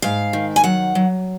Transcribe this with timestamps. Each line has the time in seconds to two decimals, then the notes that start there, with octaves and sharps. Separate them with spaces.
0.02 G#2 F5
0.33 D#3
0.56 G#5
0.64 F#3 F#5
0.95 F#3